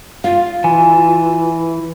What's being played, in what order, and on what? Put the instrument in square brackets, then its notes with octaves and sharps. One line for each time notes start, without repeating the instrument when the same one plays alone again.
[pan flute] F4 [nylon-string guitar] F5
[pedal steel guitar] E3 [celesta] G#5